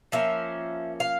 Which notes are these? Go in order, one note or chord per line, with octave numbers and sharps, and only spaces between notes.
F3 A#3 C#4 E5
F5